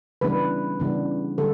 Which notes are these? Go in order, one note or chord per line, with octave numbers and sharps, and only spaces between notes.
C#3 E3 G3 B3 D4 B4
C#3 E3 G3 B3 D4
D3 G3 A4